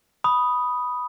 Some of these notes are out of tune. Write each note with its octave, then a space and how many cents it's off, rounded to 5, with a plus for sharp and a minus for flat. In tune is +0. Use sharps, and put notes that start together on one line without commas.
B5 -5 D#6 +0